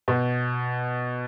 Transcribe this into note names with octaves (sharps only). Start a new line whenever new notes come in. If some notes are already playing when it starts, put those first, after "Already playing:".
B2